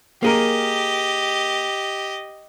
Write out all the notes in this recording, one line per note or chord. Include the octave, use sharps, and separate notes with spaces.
A#3 G4 G#4 A#4 D#5